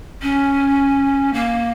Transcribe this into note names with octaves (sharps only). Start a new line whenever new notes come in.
C#4
A#3